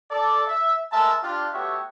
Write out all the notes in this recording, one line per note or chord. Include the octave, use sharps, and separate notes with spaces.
A4 D5
E5
G#3 A#4 E5 A5
D4 F4 G4
A3 B3 F#4 G4 C#5 E5